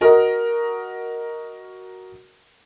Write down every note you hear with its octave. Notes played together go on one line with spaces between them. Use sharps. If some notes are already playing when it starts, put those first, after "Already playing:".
F#4 A#4 D#5